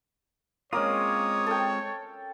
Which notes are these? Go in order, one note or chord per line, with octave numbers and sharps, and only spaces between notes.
G#3 A#3 C4 C#4 F4 C#5 D#6
A4 G5